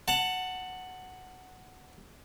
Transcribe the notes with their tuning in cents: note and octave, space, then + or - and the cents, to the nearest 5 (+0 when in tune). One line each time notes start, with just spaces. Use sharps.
F#5 +0 A5 +25